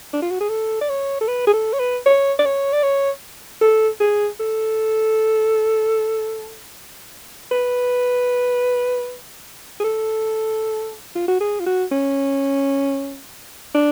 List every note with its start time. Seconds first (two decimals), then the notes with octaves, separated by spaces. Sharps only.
0.13 D4
0.22 F4
0.31 F#4
0.40 G#4
0.49 A4
0.81 D5
0.89 C#5
1.21 A4
1.28 B4
1.47 G#4
1.53 A4
1.73 C#5
1.79 B4
2.06 C#5
2.39 D5
2.45 C#5
2.73 D5
2.83 C#5
3.61 A4
4.00 G#4
4.40 A4
7.52 B4
9.80 G#4
9.84 A4
11.15 F4
11.28 F#4
11.40 G#4
11.60 F4
11.66 F#4
11.92 C#4
13.75 D4